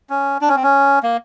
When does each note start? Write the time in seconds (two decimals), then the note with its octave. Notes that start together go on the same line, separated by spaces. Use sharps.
0.10 C#4
0.41 D4
0.48 C#4
0.56 C4
0.63 C#4
1.03 A#3